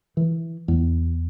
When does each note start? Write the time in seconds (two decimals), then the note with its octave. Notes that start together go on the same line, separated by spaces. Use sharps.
0.17 E3
0.68 E2